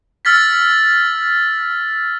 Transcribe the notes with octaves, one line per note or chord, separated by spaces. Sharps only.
E6 F6 A6 B6